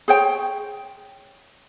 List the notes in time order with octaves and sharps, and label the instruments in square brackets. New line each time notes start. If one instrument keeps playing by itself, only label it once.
[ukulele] G#4 C5 C#5 G5